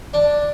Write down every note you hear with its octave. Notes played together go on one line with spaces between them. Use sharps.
D4